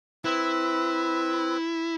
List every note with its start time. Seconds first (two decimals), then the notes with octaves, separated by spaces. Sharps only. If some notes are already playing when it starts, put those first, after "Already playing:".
0.25 C4 E4 B4